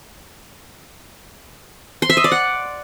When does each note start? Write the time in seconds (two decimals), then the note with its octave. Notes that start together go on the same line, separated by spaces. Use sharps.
2.02 C6
2.10 E5
2.17 D#5
2.24 D5
2.32 F#5